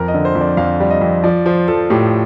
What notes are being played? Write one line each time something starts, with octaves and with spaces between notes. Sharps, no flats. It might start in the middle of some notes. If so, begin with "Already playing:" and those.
Already playing: F2 A#4
D#5
D3
C5
F2
D5
F2 F5
G3
D#5
F2
F3 D5
F3 C5
F3 A4
A2 G4